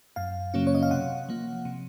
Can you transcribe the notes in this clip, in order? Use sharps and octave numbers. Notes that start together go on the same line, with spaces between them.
F#2 F5
C#3 F#3 A#3 C#4
C#5
D#5
F5
C3 F#5
F3 A#3
C3